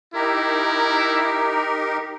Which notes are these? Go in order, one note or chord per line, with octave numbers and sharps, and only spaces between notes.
D#4 E4 G4 A#4